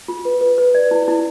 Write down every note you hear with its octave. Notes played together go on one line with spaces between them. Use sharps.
F4
B4
B4
B4
D5
E4
E4